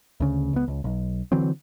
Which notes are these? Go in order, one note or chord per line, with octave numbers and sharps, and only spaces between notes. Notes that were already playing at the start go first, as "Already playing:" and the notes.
D2 C#3
C#2 B3
C#2
B1
D3 E3 F#3 C4